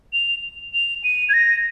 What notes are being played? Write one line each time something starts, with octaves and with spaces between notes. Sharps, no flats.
F7
F7
D#7
G#6
A#6